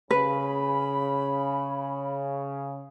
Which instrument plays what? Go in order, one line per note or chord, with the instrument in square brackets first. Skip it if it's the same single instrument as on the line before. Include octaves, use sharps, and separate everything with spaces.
[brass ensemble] C#3 [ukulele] B4 [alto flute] B5